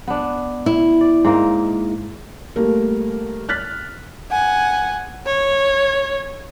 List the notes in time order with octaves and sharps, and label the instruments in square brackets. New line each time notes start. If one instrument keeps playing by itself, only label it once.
[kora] B3 D4
[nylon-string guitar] E4
[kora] D5
G#2 A#3 D#4
[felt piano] G3 A3 A#3 A#4
F6 F#6 A6 B6
[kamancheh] F#5 G#5
C#5